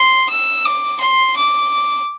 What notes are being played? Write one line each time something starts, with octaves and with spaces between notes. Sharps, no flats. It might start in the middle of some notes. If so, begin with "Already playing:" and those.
Already playing: C6
E6
D6
C6
D6